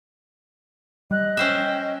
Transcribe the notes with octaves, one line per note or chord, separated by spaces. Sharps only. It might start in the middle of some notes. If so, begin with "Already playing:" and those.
G3 D#5 F#6
C#4 C5 E5 G5